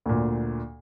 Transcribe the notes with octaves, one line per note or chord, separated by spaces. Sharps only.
D2 A#2